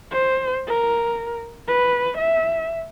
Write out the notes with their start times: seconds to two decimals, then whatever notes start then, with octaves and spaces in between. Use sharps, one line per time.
0.11 C5
0.67 A#4
1.68 B4
2.18 E5